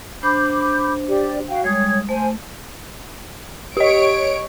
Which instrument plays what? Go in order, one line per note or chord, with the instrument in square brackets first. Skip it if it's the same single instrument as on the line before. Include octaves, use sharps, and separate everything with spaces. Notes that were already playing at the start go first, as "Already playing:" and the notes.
[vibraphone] D4 C5 [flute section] B5 D6 G6
[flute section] G4 D5
F#4 F5 G5
[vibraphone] G3 G#3 D#6 [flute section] C#5 G#6
[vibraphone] A3 [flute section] C5 G#5
[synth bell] G4 D#5 [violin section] C#5 D7